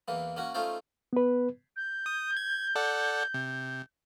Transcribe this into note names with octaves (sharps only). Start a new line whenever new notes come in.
E2 E3 A#3
A#3 C#4 F#4
A3 C#4 D#4 F4 C5
B3 B4
G6
D#6
G#6
A4 D5 F#5
C3